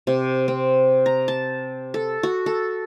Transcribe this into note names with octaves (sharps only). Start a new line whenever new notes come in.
C3
C4
A#5
A5
A4
F#4
A4